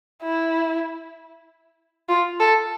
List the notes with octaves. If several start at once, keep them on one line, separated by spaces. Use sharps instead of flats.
E4
F4
A4